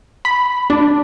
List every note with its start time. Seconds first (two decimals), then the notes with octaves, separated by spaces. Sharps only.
0.25 B5
0.70 D4